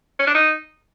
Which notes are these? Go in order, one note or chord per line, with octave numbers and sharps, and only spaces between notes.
C#4
D4
D#4